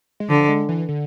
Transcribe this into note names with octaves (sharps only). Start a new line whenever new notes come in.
G#3
D3 F3
G#3
E3
D3